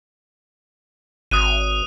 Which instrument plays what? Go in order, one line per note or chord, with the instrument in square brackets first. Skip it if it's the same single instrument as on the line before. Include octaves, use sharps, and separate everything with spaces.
[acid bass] G#1 [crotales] D#6 F#6 D#7